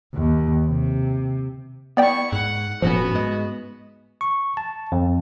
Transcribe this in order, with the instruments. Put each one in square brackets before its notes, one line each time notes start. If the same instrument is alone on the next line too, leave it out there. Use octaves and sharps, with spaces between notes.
[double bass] D#2
C3
[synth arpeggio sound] B3 D5 G5 [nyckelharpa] E4 C#6
[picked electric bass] G#2 [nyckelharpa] F#5
[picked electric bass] E1 A2 C#4 [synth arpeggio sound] F3 [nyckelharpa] B3 F#4
[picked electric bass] G#2 G#3
[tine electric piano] C#6
A5
F2